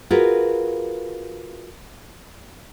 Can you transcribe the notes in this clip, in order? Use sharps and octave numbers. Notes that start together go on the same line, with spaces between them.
F4 F#4 G#4 A#4 B4